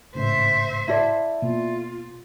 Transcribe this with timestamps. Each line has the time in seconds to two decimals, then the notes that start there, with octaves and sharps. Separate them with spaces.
0.15 G#1 A2 C#3 C5 E5
0.88 E4 A4 D5
1.42 B2 A#3 F4